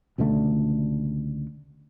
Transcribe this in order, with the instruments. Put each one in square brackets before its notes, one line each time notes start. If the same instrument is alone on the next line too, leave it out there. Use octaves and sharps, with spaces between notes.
[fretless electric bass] C#2 B2 D3 A3